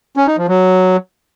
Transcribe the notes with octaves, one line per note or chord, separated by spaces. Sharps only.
C#4
D#4
F3
F#3